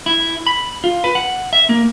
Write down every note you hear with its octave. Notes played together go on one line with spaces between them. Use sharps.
E4
B5
F4
B4
F#5
E5
A#3